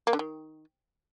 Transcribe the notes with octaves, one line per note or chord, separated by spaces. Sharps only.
A#3
D3
D#3